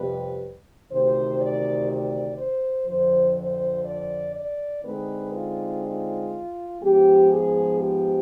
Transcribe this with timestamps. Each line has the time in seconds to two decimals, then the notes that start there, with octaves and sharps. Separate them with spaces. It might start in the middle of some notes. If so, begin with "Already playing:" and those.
Already playing: F2 C3 G3 B4
0.90 D2 C3 D#3 C5
1.39 D5
1.89 D5
2.38 C5
2.86 F2 D3 F3 C5
3.37 C5
3.85 D5
4.34 D5
4.83 D3 G#3 C4 D#4 B4
5.33 F4
5.82 F4
6.80 G#2 F3 B3 G4
7.29 G#4
7.79 G4